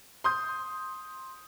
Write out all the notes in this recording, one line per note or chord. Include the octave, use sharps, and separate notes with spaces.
C6 D#6 G6